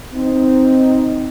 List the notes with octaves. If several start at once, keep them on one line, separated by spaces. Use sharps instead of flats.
C4 D#4